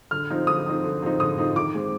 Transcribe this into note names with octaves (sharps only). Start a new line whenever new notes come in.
D3 F6
F3 C4 D#4
D3 D#6
F3 C4 D#4
D3
F3 C4 D#4
D3 D#6
F3 C4 D#4
D#3 D6
G#3 C4